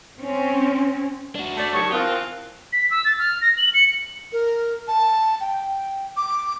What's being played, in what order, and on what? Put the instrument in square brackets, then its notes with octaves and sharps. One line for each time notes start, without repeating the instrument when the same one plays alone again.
[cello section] C4 C#4
[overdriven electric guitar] D4 F#4
[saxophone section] A3 D5
[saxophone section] D#3 F#3 [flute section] G4 A5 D#6 [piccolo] C#6
[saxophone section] E3 C4 [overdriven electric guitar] F4 [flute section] A#4 A5 [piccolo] F#6
[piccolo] B6
E6
A6
F6
A#6
F#7
C#7
[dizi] A#4
A5
G5
D6